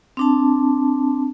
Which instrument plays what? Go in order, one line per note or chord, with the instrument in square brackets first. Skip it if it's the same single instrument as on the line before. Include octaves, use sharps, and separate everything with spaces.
[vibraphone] C4 D4 A5